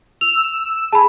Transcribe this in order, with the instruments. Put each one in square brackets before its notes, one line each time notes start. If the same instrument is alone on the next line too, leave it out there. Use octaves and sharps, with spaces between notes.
[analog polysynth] E6 [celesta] F7
[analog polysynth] G#4 [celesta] A5 B5